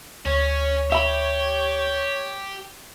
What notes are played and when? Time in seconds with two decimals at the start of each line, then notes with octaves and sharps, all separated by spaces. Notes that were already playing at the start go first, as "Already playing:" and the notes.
0.26 D2 C#4 C#5
0.92 G4 E5 B5